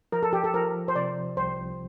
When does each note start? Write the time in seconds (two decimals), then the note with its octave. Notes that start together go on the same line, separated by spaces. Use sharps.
0.12 F3 A#4
0.23 A4
0.33 G4
0.44 A4
0.54 F3 A#4
0.88 C5
0.96 C3 D5
1.37 C2 C5